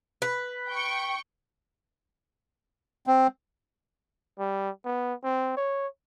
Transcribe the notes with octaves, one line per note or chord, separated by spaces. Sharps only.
B4
G5 C#6
C4
G3
B3
C4
C#5